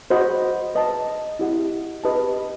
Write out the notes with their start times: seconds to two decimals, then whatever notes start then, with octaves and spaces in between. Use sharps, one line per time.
0.10 F#4 C5 D#5 F#5 B5
0.75 B4 D#5 A5
1.39 E4 G4 D#5 F#5
2.04 G4 B4 D#5 A5